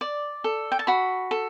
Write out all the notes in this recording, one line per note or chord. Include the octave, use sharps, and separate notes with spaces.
D5
A4
G5
A5
F#4 B5
A4